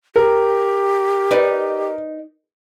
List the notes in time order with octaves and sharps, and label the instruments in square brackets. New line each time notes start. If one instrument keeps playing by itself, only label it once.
[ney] G4 [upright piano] A#4
[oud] D#4 B4 D5